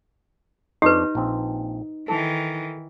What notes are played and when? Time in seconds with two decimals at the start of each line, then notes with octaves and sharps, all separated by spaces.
0.82 F2 D4 D#4 G4 B4
1.15 A#1 C4
2.08 D#3 E3 A4